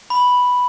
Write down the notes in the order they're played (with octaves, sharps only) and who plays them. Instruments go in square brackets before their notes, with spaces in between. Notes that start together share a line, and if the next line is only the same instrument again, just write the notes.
[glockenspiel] B5